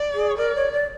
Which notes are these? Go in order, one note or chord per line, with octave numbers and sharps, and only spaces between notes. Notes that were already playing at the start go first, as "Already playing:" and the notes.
Already playing: D5
G#4
A#4 D5
C#5
D5